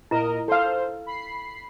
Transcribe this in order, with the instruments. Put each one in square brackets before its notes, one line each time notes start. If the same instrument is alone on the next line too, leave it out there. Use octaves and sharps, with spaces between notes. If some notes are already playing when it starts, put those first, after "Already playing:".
[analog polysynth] A#2 A#4 D#5 [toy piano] E4 A#5
[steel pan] A4 F5 [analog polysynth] C5
[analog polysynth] B5 C7